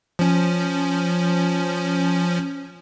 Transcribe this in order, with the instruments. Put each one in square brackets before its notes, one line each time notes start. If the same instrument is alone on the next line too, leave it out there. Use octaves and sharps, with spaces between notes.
[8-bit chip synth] F3 C#4